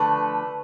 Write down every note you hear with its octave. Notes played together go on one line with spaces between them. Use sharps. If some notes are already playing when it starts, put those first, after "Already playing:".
Already playing: D3 F3 A3 B4